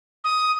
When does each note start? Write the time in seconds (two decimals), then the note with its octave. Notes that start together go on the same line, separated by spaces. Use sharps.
0.24 D#6